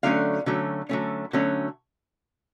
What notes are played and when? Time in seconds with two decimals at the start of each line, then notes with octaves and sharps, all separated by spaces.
0.03 D3 F#3 A3 C#4 F5
0.46 D3 F#3 A3 C#4
0.89 D3 F#3 A3 C#4
1.33 D3 F#3 A3 C#4